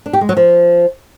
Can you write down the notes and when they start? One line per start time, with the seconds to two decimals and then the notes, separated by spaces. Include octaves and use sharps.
0.06 D4
0.13 G4
0.21 G#3
0.29 F#3
0.37 F3